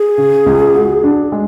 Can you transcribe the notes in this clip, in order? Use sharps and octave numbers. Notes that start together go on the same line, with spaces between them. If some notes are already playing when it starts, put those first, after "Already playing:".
Already playing: G#4
C#3
C#2
F#4
D4
G#3